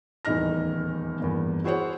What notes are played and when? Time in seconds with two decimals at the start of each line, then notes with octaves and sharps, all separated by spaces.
0.25 D#1 E2 A2 D#4 F6 A#6
1.20 E2 G2 A#3
1.64 E4 F#4 G#4 C5 C#5 F#5